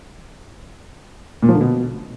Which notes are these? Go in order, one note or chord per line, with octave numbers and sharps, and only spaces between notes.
A#2
F3
D3
B2